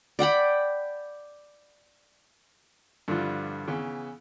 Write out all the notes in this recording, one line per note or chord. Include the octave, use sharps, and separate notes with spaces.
D5 F#5 G5 B5
G2 D3 F3 G3 E4 F4
C#3 E3 B3